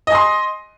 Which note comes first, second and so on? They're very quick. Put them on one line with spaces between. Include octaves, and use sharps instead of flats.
D#5 G#5 D#6 C6